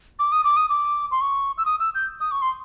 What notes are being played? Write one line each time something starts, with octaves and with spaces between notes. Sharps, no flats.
D6
D#6
D6
D#6
D6
C6
C#6
E6
D#6
E6
G6
D#6
C#6
C6